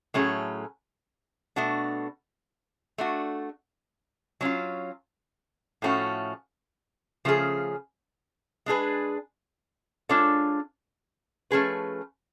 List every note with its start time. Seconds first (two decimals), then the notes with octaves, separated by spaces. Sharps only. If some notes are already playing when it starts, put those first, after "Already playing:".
0.14 A2 F#3 A3 C#4 G#4
1.56 B2 A3 D4 F#4
2.98 A3 D4 F#4
4.41 F#3 C#4 F4
5.82 A2 F3 A3 C#4 F#4
7.25 C#3 F3 A3 C#4 G#4
8.66 G#3 D4 G#4 B4
10.09 G#3 D4 F4 A4 C#5
11.51 F3 A3 C#4 G#4 B4